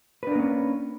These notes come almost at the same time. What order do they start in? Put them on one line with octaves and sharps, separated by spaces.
B4 D4 A#4 A#3 C#4